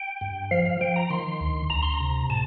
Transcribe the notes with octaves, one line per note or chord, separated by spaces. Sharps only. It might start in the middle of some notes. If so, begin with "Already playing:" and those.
Already playing: G5
G2
F3 F5
F5
F3 G5
A#5
D#3 C6
D2
D2 A#5
C6
A#5
C3
A2 A5